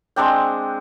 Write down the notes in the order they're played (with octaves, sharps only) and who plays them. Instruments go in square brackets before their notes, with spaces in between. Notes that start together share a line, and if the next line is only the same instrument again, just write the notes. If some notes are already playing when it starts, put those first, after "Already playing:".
[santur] G#3 C4 D4 G5